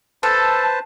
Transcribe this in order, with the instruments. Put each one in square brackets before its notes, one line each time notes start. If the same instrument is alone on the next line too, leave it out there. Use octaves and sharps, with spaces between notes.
[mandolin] A4 [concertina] B4 C5 A5